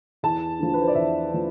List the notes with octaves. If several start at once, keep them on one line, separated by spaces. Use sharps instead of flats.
E2 A5
D3 F3
B4
C5
D5
E2 E5
D3 F3